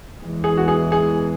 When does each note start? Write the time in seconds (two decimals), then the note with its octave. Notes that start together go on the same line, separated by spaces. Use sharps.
0.20 E2 E3 G#3
0.44 G#4
0.57 F#4
0.68 G#4
0.92 G#4